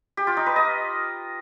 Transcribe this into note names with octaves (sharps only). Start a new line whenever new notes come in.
G4
F4
D#4
B4
D#5